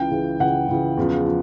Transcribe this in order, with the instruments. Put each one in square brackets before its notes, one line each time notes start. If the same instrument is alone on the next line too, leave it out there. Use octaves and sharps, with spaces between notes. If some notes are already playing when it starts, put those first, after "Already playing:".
Already playing: [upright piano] C#2 C#3 E3 G5
C#2 C#3 E3
C#2 C#3 E3 F#5
C#2 C#3 E3
E2 C#3 F3
F3